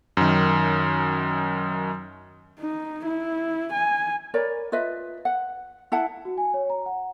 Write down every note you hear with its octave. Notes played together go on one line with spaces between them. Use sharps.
F#2 D#3
D#4
E4
G#5
A#4 C#5 D5 B5
F4 B4 D#5 E5
F#5
E4 F#5 A5
F#4
G#5
C#5
A#5
F#5